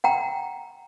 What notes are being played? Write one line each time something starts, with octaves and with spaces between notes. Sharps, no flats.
F#5 G5 A#5